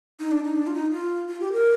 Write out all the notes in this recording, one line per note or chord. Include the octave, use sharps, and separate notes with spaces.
D#4
D4
D#4
D4
F4
D#4
F4
F4
G4
A#4